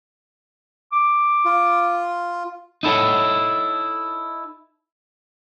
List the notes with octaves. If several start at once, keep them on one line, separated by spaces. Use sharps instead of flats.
D6
F4
D#4 E4 A4 C#5